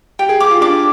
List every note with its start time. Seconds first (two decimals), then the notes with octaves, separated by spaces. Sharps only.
0.19 G4 G5
0.29 G#4
0.40 G4 D6
0.51 F4
0.61 D4 D6